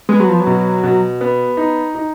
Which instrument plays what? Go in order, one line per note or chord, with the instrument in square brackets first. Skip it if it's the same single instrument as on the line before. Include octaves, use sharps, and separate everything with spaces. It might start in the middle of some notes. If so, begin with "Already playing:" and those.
[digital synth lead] G#3 [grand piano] B3
[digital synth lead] F#3
F3
F#3
[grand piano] B2
B2
B3
D#4
D#4